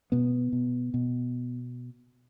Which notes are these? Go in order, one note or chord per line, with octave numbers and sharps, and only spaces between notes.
B2 B3
B2
B2